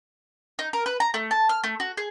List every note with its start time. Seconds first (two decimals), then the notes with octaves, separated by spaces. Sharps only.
0.59 D#4
0.73 A#4
0.86 B4
1.00 A#5
1.14 A3
1.31 A5
1.49 F6
1.64 A3
1.80 F#4
1.97 G#4